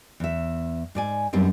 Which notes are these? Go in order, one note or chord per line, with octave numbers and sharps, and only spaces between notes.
E2 E5
G#2 D5 G#5
F#2 G3 B3 C4 D#4